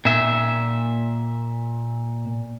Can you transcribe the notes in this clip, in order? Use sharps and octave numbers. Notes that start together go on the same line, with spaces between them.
A#2 E5